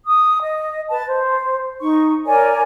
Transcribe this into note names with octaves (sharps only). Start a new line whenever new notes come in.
D#6
D#5
B4 A5
C5
D#4 C#6
A#4 C#5 D5 G#5